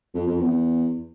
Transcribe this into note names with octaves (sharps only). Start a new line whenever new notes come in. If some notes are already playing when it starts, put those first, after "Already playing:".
F2
F2
E2